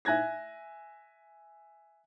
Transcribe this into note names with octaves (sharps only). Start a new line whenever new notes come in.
E5 G#5 F#6 G#6 A#6